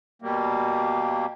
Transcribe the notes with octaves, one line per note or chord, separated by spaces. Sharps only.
B2 G3 A#3